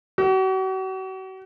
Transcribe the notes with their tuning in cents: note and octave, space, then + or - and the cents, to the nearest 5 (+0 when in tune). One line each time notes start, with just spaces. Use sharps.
F#4 +40